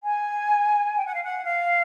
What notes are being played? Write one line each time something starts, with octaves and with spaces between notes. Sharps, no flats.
G#5
G5
F#5
F5
F#5
F5